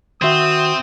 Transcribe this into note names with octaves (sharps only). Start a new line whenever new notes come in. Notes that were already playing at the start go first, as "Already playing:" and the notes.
D#3 C4 F#4 E5 G5 C6 D#6